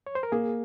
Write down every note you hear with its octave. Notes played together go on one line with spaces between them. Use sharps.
C#5
C5
A#4
A#3 G#4